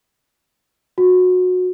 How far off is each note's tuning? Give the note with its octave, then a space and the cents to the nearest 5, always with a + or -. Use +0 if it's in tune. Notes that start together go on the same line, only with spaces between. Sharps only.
F#4 -20